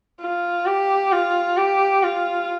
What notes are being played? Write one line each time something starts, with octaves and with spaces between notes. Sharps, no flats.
F4
G4
F4
G4
F4